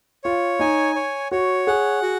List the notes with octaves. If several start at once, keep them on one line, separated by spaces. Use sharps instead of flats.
F4 C#5
D#4 G#5
C#5
F#4 C#5
G#4 F#5
F#4